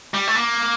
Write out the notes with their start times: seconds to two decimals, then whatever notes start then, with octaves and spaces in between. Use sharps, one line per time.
0.14 G3
0.27 A3
0.36 A#3